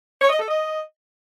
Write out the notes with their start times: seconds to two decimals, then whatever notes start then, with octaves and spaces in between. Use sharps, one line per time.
0.20 C#5
0.29 D#5
0.39 A4
0.48 D#5